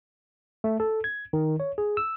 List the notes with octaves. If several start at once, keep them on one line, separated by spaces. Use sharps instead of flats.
A3
A4
G#6
D#3
C#5
G#4
E6